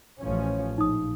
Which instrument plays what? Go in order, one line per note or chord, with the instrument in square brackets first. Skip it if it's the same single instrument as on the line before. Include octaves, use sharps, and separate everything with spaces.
[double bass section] A1 F3 C#4
[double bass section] A#1 [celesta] D#4 D#6